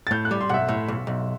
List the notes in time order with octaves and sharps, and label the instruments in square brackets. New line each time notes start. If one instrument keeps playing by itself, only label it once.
[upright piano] A6
[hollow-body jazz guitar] A2 [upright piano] G6
[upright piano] F#6
[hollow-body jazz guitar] G3
[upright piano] C6
[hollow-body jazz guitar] B1 [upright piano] F#5
[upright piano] E5
[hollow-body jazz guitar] A2
B1
B1